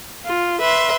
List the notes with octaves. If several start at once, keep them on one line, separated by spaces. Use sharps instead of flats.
F4
B4 E5 C6